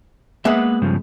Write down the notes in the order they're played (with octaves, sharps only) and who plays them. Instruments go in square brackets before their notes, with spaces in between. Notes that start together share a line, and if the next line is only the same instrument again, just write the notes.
[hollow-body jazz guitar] G#3 B3 E5 [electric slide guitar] A#3 F#5
[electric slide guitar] G2 C#3 F3